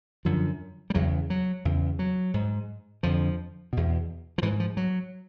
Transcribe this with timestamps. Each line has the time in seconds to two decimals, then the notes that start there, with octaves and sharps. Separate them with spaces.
0.25 F#2 D3 F3
0.90 G3
0.94 E2 C#3 F#3
1.30 F#3
1.65 E2 C#3
1.99 F#3
2.34 G#2
3.03 F2 D3 F3
3.73 E2 B2
4.38 F3
4.42 G#2 E3
4.60 F3
4.77 F#3